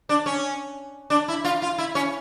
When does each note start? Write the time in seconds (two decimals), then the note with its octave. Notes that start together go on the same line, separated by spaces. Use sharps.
0.09 D4
0.26 C#4
1.10 D4
1.28 E4
1.45 F4
1.62 F4
1.78 E4
1.95 C#4